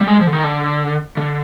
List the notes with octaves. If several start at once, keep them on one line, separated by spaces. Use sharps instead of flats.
G3
G#3
F3
D3
D#3
D3
D3